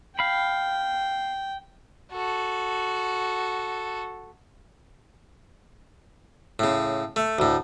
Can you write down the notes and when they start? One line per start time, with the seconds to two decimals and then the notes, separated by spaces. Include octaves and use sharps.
0.19 F5 G5 B5
2.12 F#4 A4
6.59 A2 C#3
7.16 A3
7.39 D2 A2